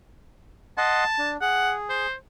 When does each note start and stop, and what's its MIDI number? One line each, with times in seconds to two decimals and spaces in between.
0.78 1.04 75
0.78 1.04 78
0.78 1.31 81
0.78 1.04 84
1.19 1.37 62
1.41 2.07 68
1.41 1.72 78
1.89 2.13 72